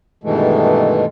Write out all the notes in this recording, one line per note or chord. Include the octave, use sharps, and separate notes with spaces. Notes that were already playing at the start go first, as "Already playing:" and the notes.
G2 B2 D#3 E3 G#3 A3